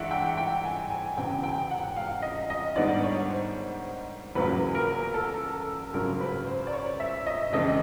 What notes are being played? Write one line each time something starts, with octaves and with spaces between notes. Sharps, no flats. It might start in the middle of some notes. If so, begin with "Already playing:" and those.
Already playing: G2 E3 G#3 E5 F#5 G5
G5
G5
G#5
G#5
E1 E2 C#3 G5
G5
F#5
F5
D#5
D#5
G#2 D#3 G3 B3 D4 D5
C#5
C5
E2 C#3 F#3 A#3 B4
A#4
A4
G#1 F#2 C#3 F#3 A#4
B4
C5
D5
C#5
E5
D#5
F2 C#3 E3 G#3 C4 D#5